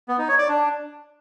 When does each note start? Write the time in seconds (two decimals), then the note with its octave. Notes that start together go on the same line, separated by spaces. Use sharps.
0.08 B3
0.18 D#4
0.28 C#5
0.38 D5
0.48 D4